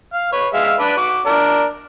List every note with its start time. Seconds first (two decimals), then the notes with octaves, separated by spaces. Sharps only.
0.13 F5
0.32 B4 C#5
0.54 G#3 E5 F5
0.79 D4 B4 D5
0.97 F#4 D6
1.26 D4 A#4 D5